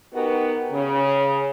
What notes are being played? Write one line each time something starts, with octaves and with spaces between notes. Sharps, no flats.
B3 D#4 F#4 G4 A#4
C#3